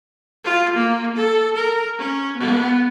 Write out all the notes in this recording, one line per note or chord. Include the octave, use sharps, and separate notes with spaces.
F4
A#3
A4
A#4
C#4
B3